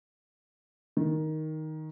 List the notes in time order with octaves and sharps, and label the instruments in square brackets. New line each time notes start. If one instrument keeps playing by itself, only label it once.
[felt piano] D#3